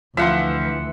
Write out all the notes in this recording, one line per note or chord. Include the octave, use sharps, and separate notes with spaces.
D2 E3 F3 E5 F#5 C6